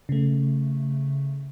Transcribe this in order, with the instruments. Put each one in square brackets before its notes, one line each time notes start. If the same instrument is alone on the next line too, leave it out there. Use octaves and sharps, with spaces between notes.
[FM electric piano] C#3 A3